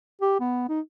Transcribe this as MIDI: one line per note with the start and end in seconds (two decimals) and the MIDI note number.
0.21 0.35 67
0.40 0.65 59
0.69 0.80 63